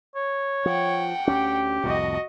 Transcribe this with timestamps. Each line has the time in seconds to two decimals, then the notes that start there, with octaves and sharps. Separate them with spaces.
0.15 C#5
0.66 F3 F#5 G5
1.28 D2 C#4 G4
1.84 C2 F2 A2 F#4 D#5